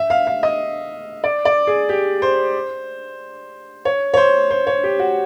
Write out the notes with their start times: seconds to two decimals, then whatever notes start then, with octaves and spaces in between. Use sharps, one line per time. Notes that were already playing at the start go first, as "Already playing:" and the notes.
Already playing: E5
0.10 F5
0.27 F5
0.43 D#5
1.24 D5
1.45 D5
1.67 G#4
1.89 G4
2.22 C5
3.85 C#5
4.14 C#5
4.17 C5
4.51 C5
4.67 C#5
4.84 G4
4.99 F#4